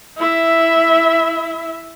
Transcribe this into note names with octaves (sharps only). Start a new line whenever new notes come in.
E4 E5